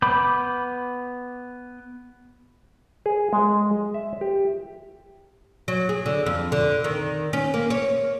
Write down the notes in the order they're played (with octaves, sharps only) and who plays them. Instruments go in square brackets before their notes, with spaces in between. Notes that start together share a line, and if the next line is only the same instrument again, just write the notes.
[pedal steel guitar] B3 B5 D6 G6
[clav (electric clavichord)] G#4
G#3
E5
G4
[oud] F#3
G#4
D3
F2
D3
D#3
C#4
A#3
C#5